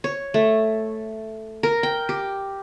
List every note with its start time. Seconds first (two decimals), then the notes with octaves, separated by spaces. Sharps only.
0.04 C#5
0.34 A3
1.63 A#4
1.83 G5
2.09 G4